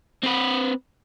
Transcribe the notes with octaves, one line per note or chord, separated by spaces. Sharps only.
C4 B4